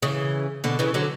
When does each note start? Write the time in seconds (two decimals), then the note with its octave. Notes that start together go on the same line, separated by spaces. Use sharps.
0.03 C#3 E3
0.64 B2 D3
0.79 C#3 E3
0.94 D3 F#3